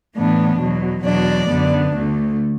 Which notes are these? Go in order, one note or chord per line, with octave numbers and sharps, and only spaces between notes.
A2 E3 B3 D4
E2 B2 F#3
E2 B2 F#3 D4 D5
F#2 D3 B3 D4
D2 D3 A3